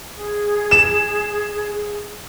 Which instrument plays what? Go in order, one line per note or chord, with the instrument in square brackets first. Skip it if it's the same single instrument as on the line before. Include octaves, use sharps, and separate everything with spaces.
[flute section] G#4
[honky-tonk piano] E7